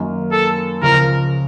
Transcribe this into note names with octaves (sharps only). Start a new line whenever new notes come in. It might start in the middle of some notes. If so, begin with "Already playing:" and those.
Already playing: F#2 D#3 A#3
A4
C#2 C#3 F3 A#4